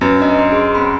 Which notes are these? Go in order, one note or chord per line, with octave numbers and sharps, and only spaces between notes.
F#2 B4 A6 A#6
D4 D#5 A#5
C6
G#4 C6
C4 C#4 B5